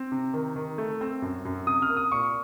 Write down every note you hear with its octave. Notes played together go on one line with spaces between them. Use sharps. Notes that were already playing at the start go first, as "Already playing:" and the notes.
Already playing: C4
C3
D#3
D#3
A3
C4
F#2
F#2
C3 D#6
F6
A#3
D#6
A#2 C#6